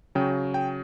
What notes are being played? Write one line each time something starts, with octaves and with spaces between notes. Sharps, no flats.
C#3 F#3 G5
G5